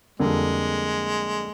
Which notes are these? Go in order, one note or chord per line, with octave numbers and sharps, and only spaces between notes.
F2 D3 G3 G#3 A#3